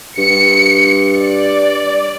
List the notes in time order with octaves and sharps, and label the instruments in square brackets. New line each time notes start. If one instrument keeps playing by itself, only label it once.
[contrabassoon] G2 [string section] C#7
[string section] D5